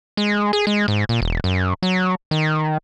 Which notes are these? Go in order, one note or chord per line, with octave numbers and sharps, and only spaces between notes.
G#3
G#4
G#3
G#2
A#2
E1
F#2
F#3
D#3